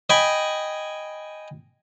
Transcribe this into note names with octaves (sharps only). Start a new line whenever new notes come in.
D#5 G5 G#5 B5